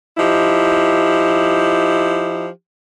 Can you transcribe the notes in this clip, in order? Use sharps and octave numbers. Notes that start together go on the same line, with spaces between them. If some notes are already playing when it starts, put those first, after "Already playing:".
F3 D#4 E4 G4